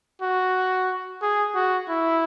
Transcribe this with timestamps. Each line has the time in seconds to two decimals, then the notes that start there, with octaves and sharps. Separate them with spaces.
0.22 F#4
1.22 G#4
1.55 F#4
1.88 E4